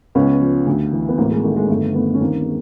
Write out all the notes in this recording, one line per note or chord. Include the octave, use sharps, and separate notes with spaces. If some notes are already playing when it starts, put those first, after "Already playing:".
C#2 B3 C#4
F3
D2
E3
B3
A1 A#3 C4
G#3 A#3
D#3 A3
G#3
G1 A3
D#3 A3 B3
C#4
D#2 A#3 C4
G#3